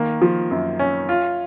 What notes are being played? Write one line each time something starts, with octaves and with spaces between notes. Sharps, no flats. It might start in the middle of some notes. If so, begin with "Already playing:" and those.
Already playing: D#3 A#3
F3
F#2
C#4
F4